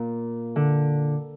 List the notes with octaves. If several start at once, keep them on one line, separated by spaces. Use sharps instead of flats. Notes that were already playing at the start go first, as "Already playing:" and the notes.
Already playing: A#2
D3